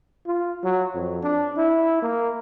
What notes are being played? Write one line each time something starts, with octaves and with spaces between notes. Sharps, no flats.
F4
F#3
F2
D4
E4
A#3